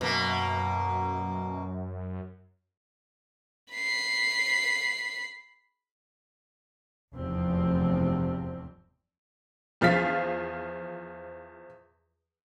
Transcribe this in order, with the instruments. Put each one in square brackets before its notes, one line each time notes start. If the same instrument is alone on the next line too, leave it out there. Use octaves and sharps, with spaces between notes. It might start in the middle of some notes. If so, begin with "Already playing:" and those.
[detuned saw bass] F#2 [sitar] B2 A#3
[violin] B5 C7
[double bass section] F1 E2 G2 F3 C4
[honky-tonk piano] E2 F3 F5 A6 B6